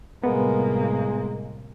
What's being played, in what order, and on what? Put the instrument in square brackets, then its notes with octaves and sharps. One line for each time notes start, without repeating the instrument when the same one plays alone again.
[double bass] A2 C3 [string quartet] G3 A#3 [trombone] G#3 [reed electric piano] B3